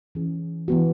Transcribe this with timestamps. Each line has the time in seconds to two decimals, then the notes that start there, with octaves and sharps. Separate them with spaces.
0.15 E3 C#4 G#4
0.68 E3 B3 F#4